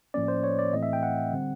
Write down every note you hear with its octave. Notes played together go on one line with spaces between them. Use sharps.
A2 F3 A#3 C#4 D5
C5
C#5
D5
A2 E3 A3 C4 D#5
E5
G5
F#5
D3 G3 C4